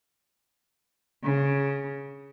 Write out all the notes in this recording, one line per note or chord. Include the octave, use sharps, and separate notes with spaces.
C#3